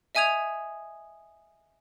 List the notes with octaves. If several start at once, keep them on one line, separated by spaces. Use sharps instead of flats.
D#5 E5 G#5 D#6 G#6 F7